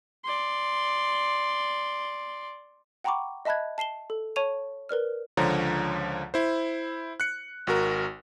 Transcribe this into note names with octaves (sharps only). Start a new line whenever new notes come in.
D5 C6
F#5 G5 A#5 B5 C#6 D6
D#5 E5 A5 B5 F#6 G#6
A5 C7 E7 G7
A4
C#5 A5 C#6 D#7 F7
A#4 B4 D5 F6
C#2 D3 F3 C#5 A#5
E4 C5
F#6 C#7
G#1 F#4 A#4